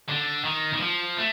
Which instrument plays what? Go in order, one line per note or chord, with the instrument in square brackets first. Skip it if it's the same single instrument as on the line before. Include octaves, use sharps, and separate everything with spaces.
[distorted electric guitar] D3
D#3
D#3
F3
A3